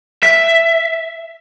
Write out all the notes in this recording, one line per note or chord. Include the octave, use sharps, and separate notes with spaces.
E5